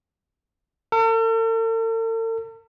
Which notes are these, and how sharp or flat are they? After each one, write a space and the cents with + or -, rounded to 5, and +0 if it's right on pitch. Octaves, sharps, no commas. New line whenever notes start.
A4 +45